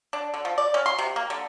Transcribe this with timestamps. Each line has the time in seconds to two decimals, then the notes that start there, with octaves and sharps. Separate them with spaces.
0.13 D4
0.34 D3
0.45 F3
0.58 D5
0.74 C#4
0.86 C6
0.99 C3
1.16 A#3
1.30 D3